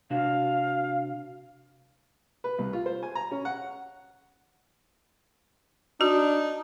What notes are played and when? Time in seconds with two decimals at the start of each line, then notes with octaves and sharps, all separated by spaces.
0.10 C3 D4 F#4 F5
2.44 B4
2.58 C2
2.73 F4
2.86 C5
3.03 G#5
3.15 A#5
3.31 C#4
3.45 F#5
6.01 D4 D#4 F#4